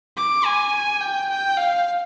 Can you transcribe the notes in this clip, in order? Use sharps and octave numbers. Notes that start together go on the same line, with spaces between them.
D6
G#5
G5
G5
F5